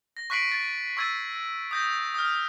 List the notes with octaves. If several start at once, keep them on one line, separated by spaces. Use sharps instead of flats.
A#6
C#6 F#6 B6 C7 D7 F#7
A6
C#6 E6 G#6 A6 D#7
D#6 G6 A#6
D#6 F6